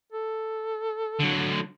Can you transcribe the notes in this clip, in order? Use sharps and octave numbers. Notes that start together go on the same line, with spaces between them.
A4
D3 F#3